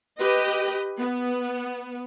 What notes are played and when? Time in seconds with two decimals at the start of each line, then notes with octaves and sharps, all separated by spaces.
0.18 G4 B4 D#5
0.98 B3